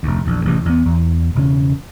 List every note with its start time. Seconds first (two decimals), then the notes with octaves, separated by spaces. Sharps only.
0.03 F1 D2
0.25 A#1 E2
0.45 A1 C3 E3
0.65 E2 B3
0.85 E2
1.35 E1 C#3 C#4